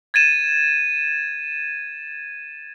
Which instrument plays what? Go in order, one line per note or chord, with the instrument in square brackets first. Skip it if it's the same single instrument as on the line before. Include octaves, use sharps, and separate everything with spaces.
[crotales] G#6 A6 D#7 E7